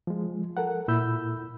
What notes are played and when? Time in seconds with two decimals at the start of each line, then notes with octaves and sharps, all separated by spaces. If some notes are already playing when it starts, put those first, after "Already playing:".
0.07 F3 G#3
0.57 A4 A#4 F#5
0.88 A#2 E4 B5 E6 G6